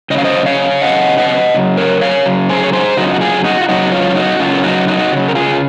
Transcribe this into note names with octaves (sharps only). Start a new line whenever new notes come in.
C#3 F#3 D#5 F5
C5 D#5
C#5 F5
C#3 F#3 D#5 F#5
D#5 F#5
C#3 F#3
A#4 C#5
C#5 F5
C#3 F#3
G#4 C5
C#5
G#4 C5
C#3 F#3 D#4 F#4
F4
F#4
F4 G#4
D#4 F#4
F4
C#3 F#3 D#4 F#4
C#4 F4
D#4 F#4
C#3 F#3 C#4 F4
D#4 F#4
D#4 F#4
C#3 F#3
A#4
F4 G#4